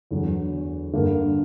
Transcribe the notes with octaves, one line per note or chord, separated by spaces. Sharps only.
E2 D3 F#3
G2 D3 A#3